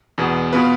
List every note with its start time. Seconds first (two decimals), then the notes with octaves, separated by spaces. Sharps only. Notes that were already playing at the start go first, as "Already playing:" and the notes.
0.18 E2 B2 B3
0.53 B2 B3 F4 B4